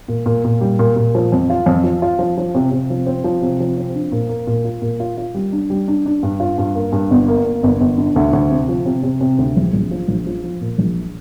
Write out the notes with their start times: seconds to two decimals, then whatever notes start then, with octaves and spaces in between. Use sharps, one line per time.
0.08 A#2
0.26 A#2
0.45 A#2
0.61 G3
0.79 A#2
0.96 A#2
1.15 F3
1.32 F2
1.50 F4
1.66 F2
1.84 F3
2.02 F4
2.19 F3
2.37 F3
2.55 C3
2.71 C3
2.90 F3
3.06 C4
3.24 F3
3.42 C3
3.60 F3
3.77 C4
3.95 D4
4.12 A#2
4.29 A#3
4.47 A#2
4.65 F4
4.82 A#2
5.00 F4
5.18 F4
5.34 G3
5.53 D4
5.70 G3
5.88 D4
6.06 D4
6.23 G2
6.40 F4
6.58 G2
6.75 A#3
6.92 G2
7.11 G1
7.28 A#3
7.45 A#3
7.63 G1
7.81 G1
7.98 D3
8.16 D2
8.33 D2
8.50 C3
8.69 F3
8.86 C3
9.03 C3
9.21 C3
9.38 D2
9.56 A#1
9.73 A#1
9.91 F3
10.08 A#1
10.26 F3
10.44 F3
10.61 A#2
10.78 A#1